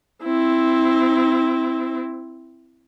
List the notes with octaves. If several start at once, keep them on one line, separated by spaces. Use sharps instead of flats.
C4 E4